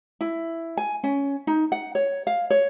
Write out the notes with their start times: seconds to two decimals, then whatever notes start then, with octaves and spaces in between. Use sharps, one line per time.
0.21 E4
0.77 G#5
1.04 C#4
1.47 D#4
1.72 F#5
1.95 C#5
2.27 F5
2.50 C#5